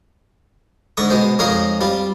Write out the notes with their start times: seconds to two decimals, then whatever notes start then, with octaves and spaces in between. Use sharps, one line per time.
0.97 G#2 D3 C#6 D#6
1.10 B2 G#3 C5
1.39 F2 G#3 C#4 D#4 A#4 F5
1.81 G3 C4 F4